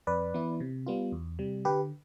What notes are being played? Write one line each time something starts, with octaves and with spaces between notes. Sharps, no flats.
F2 B4 D5
E3 B3 E4
C3
G3 B3 F4
E2
C3 G3
D3 G4 B4